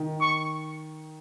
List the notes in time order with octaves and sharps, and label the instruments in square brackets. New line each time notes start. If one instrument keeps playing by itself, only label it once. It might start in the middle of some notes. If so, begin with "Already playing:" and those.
Already playing: [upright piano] D#3
[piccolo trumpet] C#6